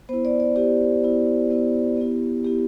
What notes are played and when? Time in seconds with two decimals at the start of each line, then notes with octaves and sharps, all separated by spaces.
0.09 B3 E4 C5
0.25 D5
0.40 D5
0.56 B3 E4 G4
1.04 B3 E4
1.50 B3 E4
1.97 B3 E4
2.44 B3 E4 G4